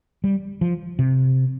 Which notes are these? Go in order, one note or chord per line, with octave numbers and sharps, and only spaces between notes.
G3
F3
C3